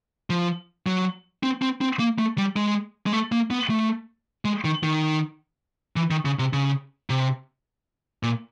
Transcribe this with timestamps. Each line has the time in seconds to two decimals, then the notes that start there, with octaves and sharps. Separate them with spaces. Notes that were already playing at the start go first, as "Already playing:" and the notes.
0.30 F3
0.86 F#3
1.43 C4
1.62 C4
1.81 C4
1.99 A#3
2.19 A3
2.38 G3
2.56 G#3
3.06 G#3
3.13 A3
3.32 A#3
3.51 B3
3.70 A3
4.45 G#3
4.64 D#3
4.83 D#3
5.96 E3
6.11 D#3
6.25 C#3
6.39 C3
6.53 C#3
7.10 C3
8.23 A#2